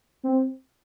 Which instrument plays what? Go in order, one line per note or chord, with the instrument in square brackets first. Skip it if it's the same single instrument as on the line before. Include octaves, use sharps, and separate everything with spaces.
[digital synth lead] C4